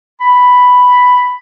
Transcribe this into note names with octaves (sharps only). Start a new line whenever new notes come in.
B5